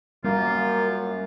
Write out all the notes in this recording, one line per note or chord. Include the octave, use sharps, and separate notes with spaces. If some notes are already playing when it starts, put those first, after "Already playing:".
F#2 G3 A#3 F4